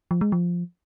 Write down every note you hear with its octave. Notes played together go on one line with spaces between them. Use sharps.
F3
G#3
F3